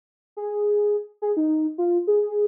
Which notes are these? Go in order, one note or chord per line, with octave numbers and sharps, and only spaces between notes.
G#4
G#4
D#4
F4
G#4